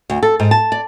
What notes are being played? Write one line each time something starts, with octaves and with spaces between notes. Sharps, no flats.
D2
A4
G#2
A5
D5